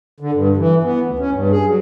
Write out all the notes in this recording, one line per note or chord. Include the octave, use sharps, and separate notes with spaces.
D3
G2
E3
B3
D2
C#4
G2
G#4
F#3